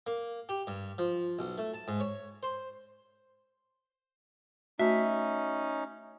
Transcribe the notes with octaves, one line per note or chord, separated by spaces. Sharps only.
A#3
G4
G2
F3
B1
A3
A5
G#2
C#5
C5
A3 C#4 D#4 F#4 E5